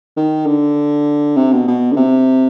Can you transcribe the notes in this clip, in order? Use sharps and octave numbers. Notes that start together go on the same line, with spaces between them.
D#3
D3
C3
B2
B2
D3
C3